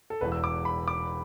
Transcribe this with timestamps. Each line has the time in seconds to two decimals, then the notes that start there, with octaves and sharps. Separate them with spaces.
0.10 A4
0.21 E1 E2 E3 B4
0.32 E6
0.44 D6
0.65 B5
0.88 D6